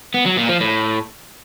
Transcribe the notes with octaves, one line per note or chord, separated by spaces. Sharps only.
B3
F#3
A#2
F3
A2